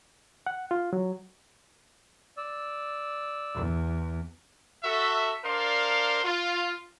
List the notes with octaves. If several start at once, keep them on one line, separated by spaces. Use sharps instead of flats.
F#5
F4
F#3
D5 E6
E2
F#4 A4 E5
D4 A#4 C5 D5 F5 C6
F4